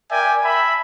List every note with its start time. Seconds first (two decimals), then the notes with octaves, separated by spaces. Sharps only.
0.10 A#4 D5 E5 G5 G#5
0.44 E5 A5 B5